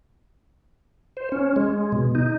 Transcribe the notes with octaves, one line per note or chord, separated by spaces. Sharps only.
C5
C#4
G#3
B2
D#4